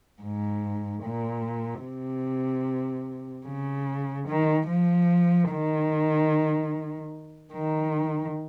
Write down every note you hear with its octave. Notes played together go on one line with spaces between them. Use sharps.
G#2
A#2
C3
C#3
D#3
F3
D#3
D#3